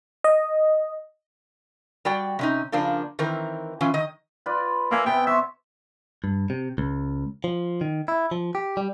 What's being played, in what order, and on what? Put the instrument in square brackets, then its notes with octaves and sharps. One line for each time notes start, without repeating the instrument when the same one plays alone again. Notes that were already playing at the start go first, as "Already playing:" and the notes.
[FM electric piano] D#5
[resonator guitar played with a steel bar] G3 F#4 D5 G5
C3 C#4 D#4
C#3 F3 A#3 D4
D#3 E3 C4 A#4
E3 C#4 F4
D#3 D#5
[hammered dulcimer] F4 B4 D5
[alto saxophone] A#3 [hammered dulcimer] A4 E5 G#5
[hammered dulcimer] C3 B3 [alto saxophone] G5
[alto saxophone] E5 [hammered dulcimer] C6 C#6
[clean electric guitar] G2
C3
C#2
F3
D#3
E4
F3
G4
G3